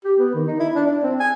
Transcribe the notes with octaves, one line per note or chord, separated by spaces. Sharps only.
G4
B3
D#3
D#4
E4
D4
D4
C4
G#5